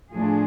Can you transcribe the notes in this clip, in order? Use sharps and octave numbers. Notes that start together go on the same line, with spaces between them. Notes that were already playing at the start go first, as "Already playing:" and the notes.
A2 F3 A3 D4 G#4